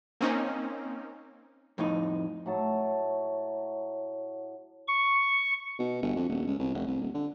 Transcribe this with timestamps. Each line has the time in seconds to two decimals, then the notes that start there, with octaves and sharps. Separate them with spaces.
0.21 A#3 C4 C#4 D#4
1.78 F2 A2 D#4
2.46 A2 F#3 A5
4.88 C#6
5.79 B2
6.02 G1
6.16 F2
6.29 D#1
6.47 C#2
6.59 C2
6.74 F1
6.87 C2
7.01 D#1
7.14 D3